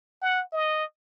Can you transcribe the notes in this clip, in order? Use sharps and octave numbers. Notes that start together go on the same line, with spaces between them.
F#5
D#5